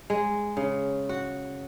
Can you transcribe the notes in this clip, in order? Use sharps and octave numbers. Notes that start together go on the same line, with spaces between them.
G#3
C#3
F#4